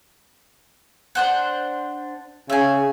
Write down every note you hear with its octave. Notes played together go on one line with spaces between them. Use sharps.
D4 C5 F#5
C#3 E5 G#5